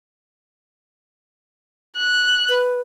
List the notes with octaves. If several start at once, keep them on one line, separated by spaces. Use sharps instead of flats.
F#6
B4